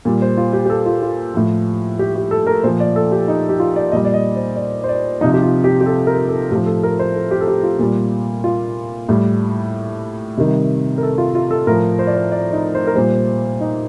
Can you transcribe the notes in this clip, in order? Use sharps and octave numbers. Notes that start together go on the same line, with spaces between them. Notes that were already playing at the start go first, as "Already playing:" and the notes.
A#2 G3
C5
F4
G4
G4
A4
F4
F4
A2 F3
G4
G4
A4
A#4
A#2 F3 C5
D5
A4
G4
D#4
G4
F4
D5
A#2 G3 D#5
D5
D#5
C5
D5
C5
D5
C3 F3 D#4
G4
F4
G4
G4
A4
A#4
A4
A2 F3 G4
A4
A#4
C5
A4
G4
A4
G4
F4
A#2 G3
F4
A2 G3
C3 D#3 G3 G4
A#4
A4
F4
F4
A4
A2 F3 A#4
C5
D5
C5
D5
D#4
C5
A#4
A#2 G3 C5
D#4